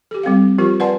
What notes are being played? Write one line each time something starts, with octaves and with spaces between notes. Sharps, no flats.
G4 A4
G3 C4 A4 F5
F3 F4 G4 A#4
B4 D5 F#5 G#5 A5 C6